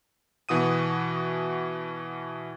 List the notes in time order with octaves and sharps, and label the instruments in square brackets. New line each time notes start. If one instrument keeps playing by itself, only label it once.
[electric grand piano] B2 E3 F#4 D#6 D#7